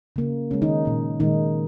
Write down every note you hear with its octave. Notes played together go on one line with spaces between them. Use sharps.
C#3 A#3
C#3 G#3 C#4
D#3 D#4
A#2 A#3
A#2 D#3 G#3 D#4